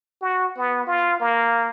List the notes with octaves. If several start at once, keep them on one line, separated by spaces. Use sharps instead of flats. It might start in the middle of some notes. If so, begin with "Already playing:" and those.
F#4
B3
F4
A#3